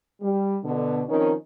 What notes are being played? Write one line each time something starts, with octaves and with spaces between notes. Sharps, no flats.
G3
B2 D3
D#3 F3 C4 C#4 D#4 A#4